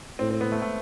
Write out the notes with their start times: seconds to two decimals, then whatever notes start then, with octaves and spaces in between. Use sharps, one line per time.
0.19 A2 C4
0.31 C4
0.41 B3
0.52 A3
0.62 A3